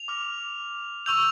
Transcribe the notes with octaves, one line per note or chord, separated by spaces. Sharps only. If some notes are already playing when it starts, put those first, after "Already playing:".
Already playing: F7
D6 F6
C#6 E6 G6 F7